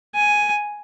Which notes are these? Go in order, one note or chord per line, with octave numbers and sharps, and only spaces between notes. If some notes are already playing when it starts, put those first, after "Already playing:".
G#5